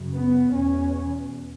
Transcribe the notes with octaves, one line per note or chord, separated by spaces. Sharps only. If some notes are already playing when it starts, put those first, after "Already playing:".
Already playing: F#2 C#3
B3
E2 B2 C#4